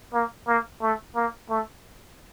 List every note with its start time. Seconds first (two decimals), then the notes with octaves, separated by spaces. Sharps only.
0.14 A#3
0.48 A#3
0.82 A3
1.16 A#3
1.49 A3